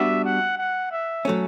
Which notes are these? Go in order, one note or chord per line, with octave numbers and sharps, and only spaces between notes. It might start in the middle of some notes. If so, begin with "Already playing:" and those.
Already playing: G3 B3 D4 F#4 E5
F#5
F#5
E5
F#3 A3 C#4